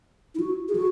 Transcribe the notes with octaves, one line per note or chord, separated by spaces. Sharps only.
E4
F#4
G#4
F#4